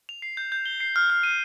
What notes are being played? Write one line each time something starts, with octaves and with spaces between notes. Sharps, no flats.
F7
C7
G6
G6
G7
C7
F6
F6
D#7